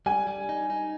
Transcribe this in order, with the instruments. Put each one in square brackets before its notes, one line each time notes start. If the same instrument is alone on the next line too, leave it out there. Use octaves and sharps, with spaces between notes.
[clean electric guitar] G3 [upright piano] G#5
[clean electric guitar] G3
D#4
D#4